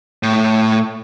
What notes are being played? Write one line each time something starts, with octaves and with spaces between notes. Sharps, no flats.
A2